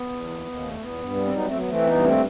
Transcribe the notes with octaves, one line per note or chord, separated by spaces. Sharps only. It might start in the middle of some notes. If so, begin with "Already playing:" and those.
Already playing: B3
E2
D#2
D#2
E2 A3
E2 B3
G2
G3
C4
F#3 B3 D#4
A3 C4
F#3
B3
E3 A3 C4
G2 B3 D#4
D#2 A3 C4